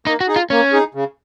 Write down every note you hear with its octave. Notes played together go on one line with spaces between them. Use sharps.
A#3 D#4
F#4
D#4 G#4
F4
A#3 C#4
D#4 G#4
C#3